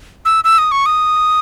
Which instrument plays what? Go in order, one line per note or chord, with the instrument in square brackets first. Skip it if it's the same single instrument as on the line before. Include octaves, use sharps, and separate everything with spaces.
[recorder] E6
E6
D#6
C#6
D#6